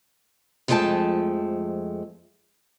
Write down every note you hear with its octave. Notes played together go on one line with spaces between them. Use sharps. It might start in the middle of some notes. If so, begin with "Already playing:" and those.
F2 F3 G#3 A3 G5 A5